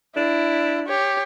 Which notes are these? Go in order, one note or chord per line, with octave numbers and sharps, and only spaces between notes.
D4 E4
G4 C#5